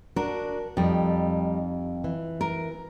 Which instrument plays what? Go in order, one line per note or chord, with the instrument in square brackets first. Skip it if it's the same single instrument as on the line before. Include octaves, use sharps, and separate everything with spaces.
[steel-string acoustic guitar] D4 F#4 [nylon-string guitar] A#4
[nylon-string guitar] F2 [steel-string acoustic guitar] G3 D#4
[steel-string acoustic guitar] E3
[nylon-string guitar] A#4